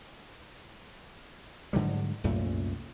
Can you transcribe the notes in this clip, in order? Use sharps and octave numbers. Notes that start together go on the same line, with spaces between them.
G#2 D3 F#3 G3
C2 F#2 A#2 A3